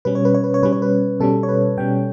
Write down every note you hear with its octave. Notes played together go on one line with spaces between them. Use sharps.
B2 G3 C#4 B4
C#5
B4
C#5
B4
C#5
B2 G3 C#4 B4
C#5
B4
B2 G3 C#4 A4
C#5
B4
B2 G3 C#4 G5